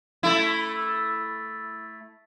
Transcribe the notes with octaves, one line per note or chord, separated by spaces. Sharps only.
A3 E4